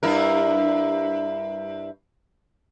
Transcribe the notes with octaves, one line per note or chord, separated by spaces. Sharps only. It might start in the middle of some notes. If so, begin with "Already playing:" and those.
G2 E4 A#4